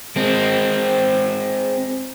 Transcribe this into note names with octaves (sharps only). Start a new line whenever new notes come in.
G#3 C4